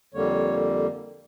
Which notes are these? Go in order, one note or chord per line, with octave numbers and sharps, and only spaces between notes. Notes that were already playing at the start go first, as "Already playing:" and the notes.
F2 D3 G3 A#3 C#5